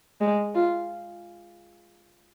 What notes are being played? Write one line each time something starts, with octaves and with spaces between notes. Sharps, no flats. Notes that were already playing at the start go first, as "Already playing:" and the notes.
G#3
F4